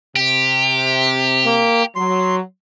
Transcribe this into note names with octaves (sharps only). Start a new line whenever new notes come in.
C3 G4
A#3
F#3 C6